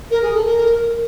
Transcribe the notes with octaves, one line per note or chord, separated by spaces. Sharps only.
A#4
G#4
A4
A#4